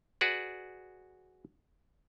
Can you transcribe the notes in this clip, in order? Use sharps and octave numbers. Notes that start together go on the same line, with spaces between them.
F#4 G#4 B4 D5